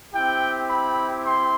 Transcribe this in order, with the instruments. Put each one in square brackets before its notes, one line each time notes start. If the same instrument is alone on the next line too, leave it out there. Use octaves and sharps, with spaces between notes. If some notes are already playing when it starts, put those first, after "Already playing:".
[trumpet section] C4 E4 G4 G5
B5
C6